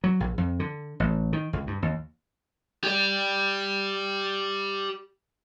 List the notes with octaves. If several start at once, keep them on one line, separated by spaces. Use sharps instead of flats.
F#3
A#1
F2
D3
A1
D#3
C#2
G2
D#2
G4 D5